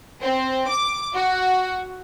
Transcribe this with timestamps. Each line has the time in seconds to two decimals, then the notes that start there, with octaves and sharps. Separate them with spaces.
0.22 C4
0.69 D6
1.15 F#4